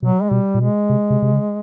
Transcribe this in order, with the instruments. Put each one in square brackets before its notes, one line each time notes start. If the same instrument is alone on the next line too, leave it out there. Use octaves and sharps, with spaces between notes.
[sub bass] B2 [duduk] F#3
[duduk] G#3
[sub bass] B2 [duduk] G3
[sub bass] A#2
[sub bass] B2 [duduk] G#3
[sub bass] C3
C3
C3
C#3